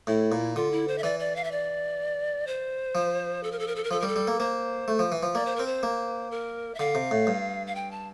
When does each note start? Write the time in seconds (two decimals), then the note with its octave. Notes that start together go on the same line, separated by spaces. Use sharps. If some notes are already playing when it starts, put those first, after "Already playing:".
0.07 A2 E4
0.32 A#2
0.55 D3 F4
0.72 E4
0.88 C5
0.98 E5
1.03 E3 D5
1.19 D5
1.36 F5
1.44 E5
1.51 D5
2.47 C5
2.95 F3
3.43 A4
3.52 A#4
3.59 A4
3.67 A#4
3.76 A4
3.84 A#4
3.91 F3 A4
4.00 G3 A#4
4.08 A4
4.16 G3
4.27 A#3
4.39 A#3 C5
4.88 A3
4.99 F3
5.12 E3
5.23 F3
5.35 A#3 D5
5.46 C5
5.56 C4 A#4
5.66 C5
5.83 A#3
6.31 A#4
6.75 E5
6.79 D3 F5
6.95 C3
7.11 A2
7.27 G2
7.67 F5
7.75 G5
7.91 A5